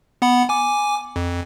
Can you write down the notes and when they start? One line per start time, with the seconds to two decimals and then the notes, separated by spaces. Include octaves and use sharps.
0.22 B3 F#5 B5
0.49 G#5 D6
1.16 F2